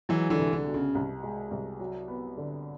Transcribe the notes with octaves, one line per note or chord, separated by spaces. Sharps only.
E3 F#3 G#3
D3 E3
C2
D3
B2
C#3
C2
G#3
C2
F#3
B3
D3